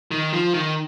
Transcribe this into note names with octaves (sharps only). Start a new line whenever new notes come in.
D#3
F3
D#3